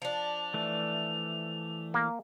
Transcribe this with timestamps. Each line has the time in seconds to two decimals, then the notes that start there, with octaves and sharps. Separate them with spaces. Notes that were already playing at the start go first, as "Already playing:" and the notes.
0.02 F3 D4 F7
0.54 E3 A3
1.94 A#3